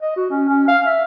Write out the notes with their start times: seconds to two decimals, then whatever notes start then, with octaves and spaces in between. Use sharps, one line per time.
0.02 D#5
0.16 F#4
0.30 C#4
0.48 C#4
0.68 F5
0.86 E5